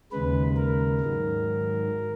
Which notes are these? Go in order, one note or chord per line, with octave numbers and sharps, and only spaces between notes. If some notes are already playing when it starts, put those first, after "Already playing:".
D#2 C#3 G#3 B4
A#4
G#2 D#3 F#3